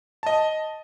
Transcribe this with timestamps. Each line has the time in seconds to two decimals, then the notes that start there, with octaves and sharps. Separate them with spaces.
0.23 D#5 A5